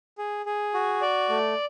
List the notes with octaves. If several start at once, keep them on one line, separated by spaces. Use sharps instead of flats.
G#4
G#4
F#4
D5
A3